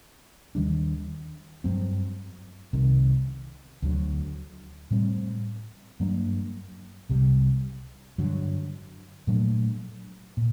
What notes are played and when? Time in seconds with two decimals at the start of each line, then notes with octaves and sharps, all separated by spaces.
0.55 D#2 D#3 G3 D4
1.64 G2 F#3 C4
2.73 C2 C3 D#3
3.82 D2 D3 F#3
4.91 A2 G3 C4
6.00 G2 F#3 A#3 D4
7.09 C2 C3 G3
8.18 G2 D3 F#3
9.27 A#2 F#3 A3 D4
10.37 A#2